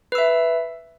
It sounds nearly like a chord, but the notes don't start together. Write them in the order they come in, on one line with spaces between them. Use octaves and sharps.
B4 E6 E5